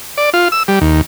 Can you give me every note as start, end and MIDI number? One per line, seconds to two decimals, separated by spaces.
0.18 0.30 74
0.34 0.48 65
0.52 0.63 88
0.68 0.79 55
0.81 1.01 39